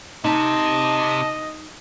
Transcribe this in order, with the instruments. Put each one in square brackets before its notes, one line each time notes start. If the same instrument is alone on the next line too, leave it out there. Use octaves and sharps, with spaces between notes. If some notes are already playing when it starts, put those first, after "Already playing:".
[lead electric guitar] C3 [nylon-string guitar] D#4 [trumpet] D#5 [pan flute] A5